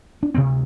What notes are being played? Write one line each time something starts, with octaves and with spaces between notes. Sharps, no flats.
D4
D2 C3 C4